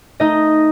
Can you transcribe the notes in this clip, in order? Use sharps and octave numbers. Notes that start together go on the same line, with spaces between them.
A3 D#4 D#5